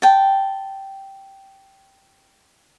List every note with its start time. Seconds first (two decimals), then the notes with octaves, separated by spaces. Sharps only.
0.02 G5 A5